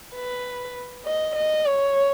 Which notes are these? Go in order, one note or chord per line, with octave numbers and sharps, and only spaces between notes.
B4
D#5
D#5
C#5